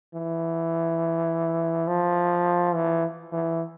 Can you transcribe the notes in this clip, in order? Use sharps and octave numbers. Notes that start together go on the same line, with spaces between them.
E3
F3
E3
E3